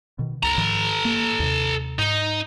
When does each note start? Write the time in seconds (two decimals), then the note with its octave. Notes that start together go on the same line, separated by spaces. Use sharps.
0.19 B2 D#3
0.43 C2 A4 A#5
0.58 G#2 D#3 F3
1.05 A#3
1.40 D#2 C3
1.99 G#2 D#4